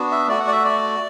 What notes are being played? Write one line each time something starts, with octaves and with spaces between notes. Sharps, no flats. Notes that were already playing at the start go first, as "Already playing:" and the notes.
Already playing: B3 D4 F#4
E5
A3 F#4 D5
F#5
D5
E5
D5